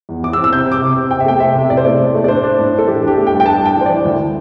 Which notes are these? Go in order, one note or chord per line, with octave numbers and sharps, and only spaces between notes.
E2
E3 D6
E6
C4
E6
C3 G6
C4 D6
C3
C4
C3 G5
E5
A3 G5
C4 E5
C3
A2 D5
C5
A3 D5
A2
A3
D5
D4 C5
D4
A2
D4
A4
E3 G4
D4
G4
A3
G2 G5
G5
D4 A5
D4 G5
E3
C5
E3 D5
D2